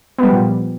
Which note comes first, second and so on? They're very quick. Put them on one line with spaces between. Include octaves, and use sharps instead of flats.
B3 G3 F3 A#2